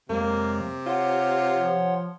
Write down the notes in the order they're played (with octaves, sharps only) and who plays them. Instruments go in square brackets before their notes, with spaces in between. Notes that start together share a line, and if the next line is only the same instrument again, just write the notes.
[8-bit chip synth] F2 F#3 G#3 [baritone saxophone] C3 [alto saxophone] A#3
[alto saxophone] F4 [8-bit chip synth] C#5 F#5 C6
[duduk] F3